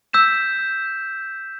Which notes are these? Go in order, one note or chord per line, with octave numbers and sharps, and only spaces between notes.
E6 G6 B6 E7